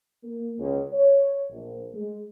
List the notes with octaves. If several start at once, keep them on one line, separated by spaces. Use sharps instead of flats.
A#3
C#2
C#5
A#1
G#3